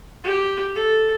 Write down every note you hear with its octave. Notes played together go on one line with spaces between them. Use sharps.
G4
A4